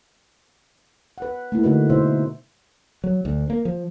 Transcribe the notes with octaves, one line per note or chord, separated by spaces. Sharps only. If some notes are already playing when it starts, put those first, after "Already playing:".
B4 F#5
A3 A#3 E4
D3 A3 D#4 F#4 B4
B2 D#4 E4 C5 E5
F#3
D2
A#3
F3